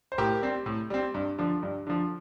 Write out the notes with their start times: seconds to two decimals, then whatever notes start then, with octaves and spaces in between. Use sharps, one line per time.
0.12 C5
0.18 A2 G4 A#4
0.42 G3 C4
0.66 A2
0.90 G3 C4
1.14 G2
1.38 D3 F3
1.63 G2
1.87 D3 F3